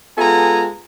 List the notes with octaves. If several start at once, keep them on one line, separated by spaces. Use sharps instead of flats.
G#3 B3 F4 A4 G#5 A#5